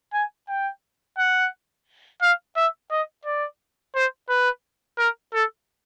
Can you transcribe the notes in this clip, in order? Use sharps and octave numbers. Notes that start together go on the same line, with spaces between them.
G#5
G5
F#5
F5
E5
D#5
D5
C5
B4
A#4
A4